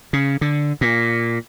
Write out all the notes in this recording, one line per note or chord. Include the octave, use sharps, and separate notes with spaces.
C#3
D3
A#2